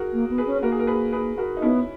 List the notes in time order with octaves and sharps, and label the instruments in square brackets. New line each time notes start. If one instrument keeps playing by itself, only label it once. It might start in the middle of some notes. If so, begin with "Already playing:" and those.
Already playing: [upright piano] F#4 G#4 A#4
[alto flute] A#3
B3
[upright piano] G#4 B4
[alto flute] C#4
[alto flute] A#3 [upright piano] F#4 A#4
[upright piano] G#4
A#4
G#4 B4
G#4 B4
F#4 A#4
D#4
[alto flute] B3 [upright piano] C#4 E4